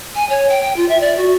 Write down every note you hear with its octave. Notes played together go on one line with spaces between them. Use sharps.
G#5
C#5
G5
G5
F4
E5
D5
F#4